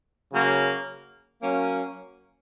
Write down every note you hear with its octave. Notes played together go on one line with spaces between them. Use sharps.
C#3 F#3 A#3
F#3 A#3 C#4